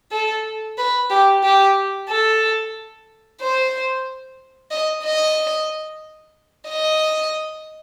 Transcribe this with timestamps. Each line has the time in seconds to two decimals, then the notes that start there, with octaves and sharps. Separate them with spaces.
0.12 A4
0.78 B4
1.10 G4
1.44 G4
2.09 A4
3.41 C5
4.71 D#5
5.04 D#5
6.69 D#5